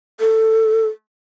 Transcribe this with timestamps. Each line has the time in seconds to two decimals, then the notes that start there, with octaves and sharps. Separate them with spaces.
0.20 A4